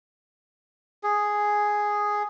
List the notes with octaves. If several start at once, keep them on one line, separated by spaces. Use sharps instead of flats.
G#4